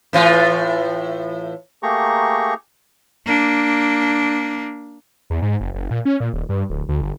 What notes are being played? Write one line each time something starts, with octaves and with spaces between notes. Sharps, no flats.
A2 E3 F4
A3 A#3 G4 G#4 A#5 C#6
A#3 D4
E2
G#2
F#1
F#1
A#2
C#4
A#2
D#1
G2
D1
D2
G1